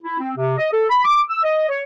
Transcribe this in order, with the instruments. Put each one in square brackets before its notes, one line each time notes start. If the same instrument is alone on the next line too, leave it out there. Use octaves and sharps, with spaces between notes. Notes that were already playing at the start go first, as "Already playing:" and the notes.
[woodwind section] E4
C4
C3
D#5
A4
B5
D6
E6
D#5
C#5